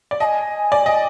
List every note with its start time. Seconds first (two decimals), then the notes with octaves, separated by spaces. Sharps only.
0.11 D5
0.20 D#5 A5
0.25 G#5
0.72 D5
0.86 D#5